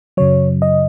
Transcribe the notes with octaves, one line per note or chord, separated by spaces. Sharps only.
F#2 C#3 F#3 C#5
D#5